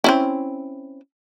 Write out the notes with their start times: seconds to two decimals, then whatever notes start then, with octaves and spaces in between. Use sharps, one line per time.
0.04 C4 C#4 E4